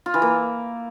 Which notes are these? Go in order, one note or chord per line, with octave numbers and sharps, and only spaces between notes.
F4
E3
A#3